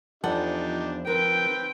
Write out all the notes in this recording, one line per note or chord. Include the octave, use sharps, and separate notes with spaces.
E2 F3 D4 D#4 G4 A4 F#5
C4 A#4 B4 G5